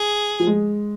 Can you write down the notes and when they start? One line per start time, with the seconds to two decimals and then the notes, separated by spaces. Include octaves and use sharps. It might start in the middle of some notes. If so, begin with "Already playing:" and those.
Already playing: G#4
0.40 F3
0.47 G#3